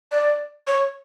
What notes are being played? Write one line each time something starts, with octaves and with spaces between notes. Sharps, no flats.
D5
C#5